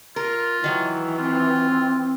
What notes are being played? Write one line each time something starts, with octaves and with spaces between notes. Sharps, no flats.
F4 A#4
D#3 E3 F#3
C4 F4